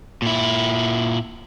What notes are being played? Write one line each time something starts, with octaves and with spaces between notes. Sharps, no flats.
A#2 E4